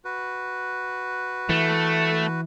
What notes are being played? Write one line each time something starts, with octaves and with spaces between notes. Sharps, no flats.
F#4 B4
E3 A3